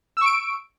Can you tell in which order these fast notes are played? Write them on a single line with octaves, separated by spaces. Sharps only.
E6 C#6 D7